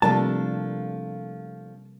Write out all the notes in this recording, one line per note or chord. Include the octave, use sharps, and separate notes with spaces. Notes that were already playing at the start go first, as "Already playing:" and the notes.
C3 F3 G3 A3 A#3 D4 A5